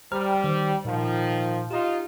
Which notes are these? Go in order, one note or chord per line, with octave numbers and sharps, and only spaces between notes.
G3 C5 A#5 F6
D#3 C5
A#2 D#3 F3
D#4 F4 G4